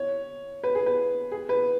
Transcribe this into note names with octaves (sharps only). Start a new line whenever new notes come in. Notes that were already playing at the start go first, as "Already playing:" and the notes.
Already playing: C#5
B4
G#4
B4
G#4
B4